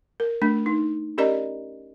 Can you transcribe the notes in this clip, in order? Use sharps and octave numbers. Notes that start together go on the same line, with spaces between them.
A#4
A3 D4
D#4
C#4 G4 A#4 D5 D#5 A#5